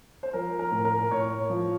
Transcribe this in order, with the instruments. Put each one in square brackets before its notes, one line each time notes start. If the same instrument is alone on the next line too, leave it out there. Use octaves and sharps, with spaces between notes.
[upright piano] C5
F3 A#4
A#4
A2
A#4
A2 C#5
F3